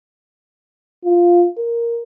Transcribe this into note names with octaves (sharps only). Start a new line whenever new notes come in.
F4
A#4